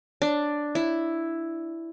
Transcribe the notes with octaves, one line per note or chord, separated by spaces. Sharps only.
D4
E4